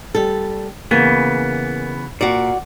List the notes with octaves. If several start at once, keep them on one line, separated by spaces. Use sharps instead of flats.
G3 A4
C#3 E3 A#3 B3
A#2 F#4 D5